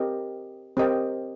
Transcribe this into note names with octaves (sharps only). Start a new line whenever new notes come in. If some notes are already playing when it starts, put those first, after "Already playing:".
Already playing: C4 G4 A#4 D#5 G5
C4 G4 A#4 D#5 G5